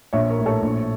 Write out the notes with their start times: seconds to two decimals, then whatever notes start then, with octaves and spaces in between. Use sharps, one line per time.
0.13 A#1 C#5 E5
0.29 A#4
0.38 A2
0.46 A4 C#5
0.63 A#1